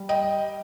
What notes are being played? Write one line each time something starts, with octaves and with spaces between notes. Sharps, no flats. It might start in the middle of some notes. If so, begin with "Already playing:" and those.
Already playing: G3
D#5 G5